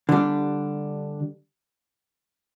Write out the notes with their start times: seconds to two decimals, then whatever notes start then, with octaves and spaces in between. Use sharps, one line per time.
0.09 D3 G3 D4